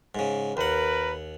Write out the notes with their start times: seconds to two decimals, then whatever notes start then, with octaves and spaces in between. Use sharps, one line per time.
0.15 G#2 C#3
0.57 D#2 A#4 B4 F#5